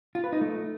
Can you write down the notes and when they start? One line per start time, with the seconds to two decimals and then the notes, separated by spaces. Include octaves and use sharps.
0.15 F4
0.24 B4
0.33 D#4
0.41 A3